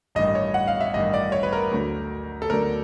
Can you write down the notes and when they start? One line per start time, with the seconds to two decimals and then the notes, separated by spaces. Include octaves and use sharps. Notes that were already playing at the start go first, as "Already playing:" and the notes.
0.15 A1 G2 D#3 D#5
0.35 C#5
0.54 F#5
0.68 F5
0.81 E5
0.94 A1 G2 D#3 D#5
1.14 D5
1.32 C#5
1.43 B4
1.53 A#4
1.71 D2 D3 F#3 A3 D4
2.42 A4
2.49 D2 D3 F#3 A3 D4 A#4